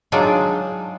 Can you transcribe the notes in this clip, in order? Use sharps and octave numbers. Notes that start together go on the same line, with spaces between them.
F#3 G#3 D4 D#4 F4